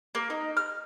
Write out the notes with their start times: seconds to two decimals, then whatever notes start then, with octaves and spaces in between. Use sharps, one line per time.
0.15 A#3
0.30 D#4
0.57 F6